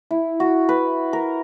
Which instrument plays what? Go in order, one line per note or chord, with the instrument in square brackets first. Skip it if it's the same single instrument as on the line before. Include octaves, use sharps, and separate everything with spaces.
[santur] E4
F#4
B4
A#4